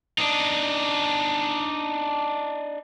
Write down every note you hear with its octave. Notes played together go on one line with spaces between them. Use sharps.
D4 D#4